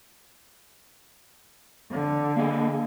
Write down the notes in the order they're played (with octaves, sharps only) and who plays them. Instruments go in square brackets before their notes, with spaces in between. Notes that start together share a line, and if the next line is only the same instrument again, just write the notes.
[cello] D3
[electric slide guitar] A#3 G#4 D#5